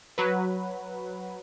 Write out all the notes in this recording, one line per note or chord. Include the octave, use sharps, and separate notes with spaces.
F#3 B4